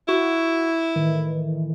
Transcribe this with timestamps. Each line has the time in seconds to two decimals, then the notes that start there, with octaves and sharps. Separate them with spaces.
0.09 E4 F#4
0.96 A2 D#3 E3